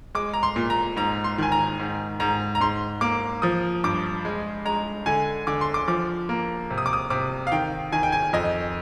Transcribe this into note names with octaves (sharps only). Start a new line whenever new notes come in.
G#3 D6
A#5
C6
A#2
A#5
G#2 A#5
C6
D#3 G#5
A#5
G#2
G#2 A#5
A#5
G#2 C6
A#3 D6
F3 D#6
G2 D6
G#3
G#3 A#5
D3 G#5
D3 D6
C6
D6
F3 D6
A#3
C3
D#6
D6
D#6
C3 D6
F5
D#3 G5
D#3 G#5
G5
G#5
F2 D#5